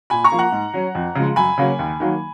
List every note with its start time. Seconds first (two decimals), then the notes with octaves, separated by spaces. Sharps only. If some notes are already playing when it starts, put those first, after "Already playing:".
0.10 A#2 G#5 B5
0.24 A#5 C#6
0.32 F3 A#3
0.39 F#5 A#5
0.52 G#2
0.74 F#3 C#4
0.95 F2
1.15 C#3 F3 G#3
1.36 F#2 G#5 B5
1.58 C#3 F#3 A#3 C#4
1.79 D#2
2.00 D#3 F#3 A#3